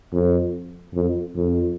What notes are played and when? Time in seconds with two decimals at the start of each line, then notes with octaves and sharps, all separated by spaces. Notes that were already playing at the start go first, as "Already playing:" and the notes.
0.13 F2
0.95 F2
1.36 F2